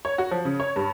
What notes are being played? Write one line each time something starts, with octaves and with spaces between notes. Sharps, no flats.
C#5
F#4
F3
C#3
C#5
G2